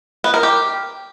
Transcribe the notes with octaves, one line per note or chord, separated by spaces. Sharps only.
B3
A#4
G4